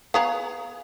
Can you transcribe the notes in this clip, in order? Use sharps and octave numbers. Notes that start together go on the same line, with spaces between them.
B3 G#4 F5 A#5